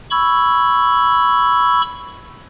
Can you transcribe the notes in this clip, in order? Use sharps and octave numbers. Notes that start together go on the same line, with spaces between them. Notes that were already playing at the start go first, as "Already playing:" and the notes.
B5 C#6 E6 G#6